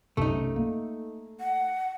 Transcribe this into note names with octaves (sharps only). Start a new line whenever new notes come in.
B1 F#2 C3 A3 D#4
A#3
F#5